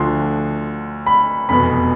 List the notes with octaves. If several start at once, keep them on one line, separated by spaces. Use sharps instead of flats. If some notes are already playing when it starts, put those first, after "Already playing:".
Already playing: D2 D3 F3 C6
B5
F1 E2 B2 B5